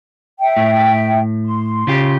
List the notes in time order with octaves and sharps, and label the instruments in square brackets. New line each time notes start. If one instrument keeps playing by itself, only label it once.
[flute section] E5 G5
[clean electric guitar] A2
[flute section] C6
[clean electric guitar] C#3 F4 G4